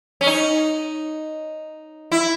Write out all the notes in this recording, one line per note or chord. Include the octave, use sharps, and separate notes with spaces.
C#4
D#4
E4